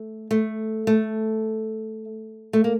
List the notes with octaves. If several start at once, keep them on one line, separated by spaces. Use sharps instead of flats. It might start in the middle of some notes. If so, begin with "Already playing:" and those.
Already playing: A3
A3
A3
A3
A#3